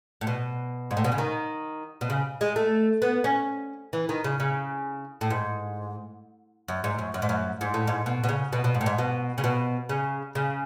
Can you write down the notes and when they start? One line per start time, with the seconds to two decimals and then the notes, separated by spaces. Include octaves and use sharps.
0.21 A2
0.27 B2
0.91 G#2
0.97 A2
1.04 B2
1.12 C#3
1.18 D#3
2.01 B2
2.10 C#3
2.41 G#3
2.56 A3
3.02 B3
3.24 C#4
3.93 E3
4.09 D#3
4.24 C#3
4.40 C#3
5.21 A2
5.30 G#2
6.68 F#2
6.84 G#2
6.99 F#2
7.14 F#2
7.22 G#2
7.29 F#2
7.61 G#2
7.74 A2
7.87 G#2
8.06 B2
8.24 B2
8.29 C#3
8.53 B2
8.64 B2
8.74 G#2
8.81 A2
8.86 G#2
8.98 B2
9.38 C#3
9.44 B2
9.89 C#3
10.35 C#3